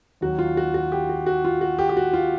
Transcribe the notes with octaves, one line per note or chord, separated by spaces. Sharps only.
D#2 D#3 F#3 F#4
F4
F#4
F#4
G4
F#4
F#4
F4
F#4
G4
G4
F#4
F4